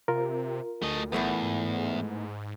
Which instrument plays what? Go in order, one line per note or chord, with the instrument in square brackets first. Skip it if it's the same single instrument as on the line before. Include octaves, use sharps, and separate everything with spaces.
[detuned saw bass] C3 [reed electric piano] F4 A#4
[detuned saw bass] D2 [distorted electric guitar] A3 D#5
[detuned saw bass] B1 [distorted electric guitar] E2 [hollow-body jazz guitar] A2 A3 B3
[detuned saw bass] G#2